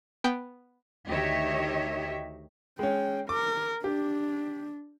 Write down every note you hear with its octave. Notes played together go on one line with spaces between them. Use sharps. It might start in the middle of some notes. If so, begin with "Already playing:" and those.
B3 G5
D2 D#3 G4 C#5 D#5 E5
G#3 C#4 G5
A#4 D6
D4 G4